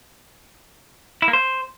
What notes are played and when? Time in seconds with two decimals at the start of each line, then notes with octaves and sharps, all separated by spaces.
1.22 E4
1.28 A#3
1.33 C5